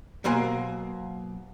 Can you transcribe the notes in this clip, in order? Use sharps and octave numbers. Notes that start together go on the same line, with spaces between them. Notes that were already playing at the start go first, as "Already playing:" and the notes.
B2 F#3 A#3 C5 G#5